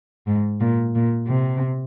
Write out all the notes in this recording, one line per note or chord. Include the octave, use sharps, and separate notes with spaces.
G#2
A#2
A#2
C3